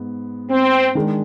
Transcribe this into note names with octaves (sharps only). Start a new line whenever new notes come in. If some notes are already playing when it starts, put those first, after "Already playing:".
Already playing: G#2 B3
C4
D#3 G#3 D4